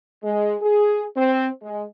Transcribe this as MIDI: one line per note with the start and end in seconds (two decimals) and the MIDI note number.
0.23 0.54 56
0.61 1.04 68
1.16 1.47 60
1.62 1.83 56